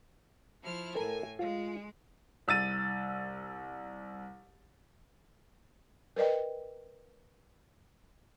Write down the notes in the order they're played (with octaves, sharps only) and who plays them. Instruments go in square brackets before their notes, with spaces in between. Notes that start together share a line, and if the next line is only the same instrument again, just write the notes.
[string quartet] F3 E4 F6
[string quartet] A2 G#5 [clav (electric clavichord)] A4 A#4 A#5
[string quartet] G#3 [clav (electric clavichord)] F4
[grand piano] C2 E6 A6 D#7
[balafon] A#4 B4 D5 D#5 G5